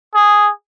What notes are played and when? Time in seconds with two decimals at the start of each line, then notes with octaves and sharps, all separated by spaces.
0.15 G#4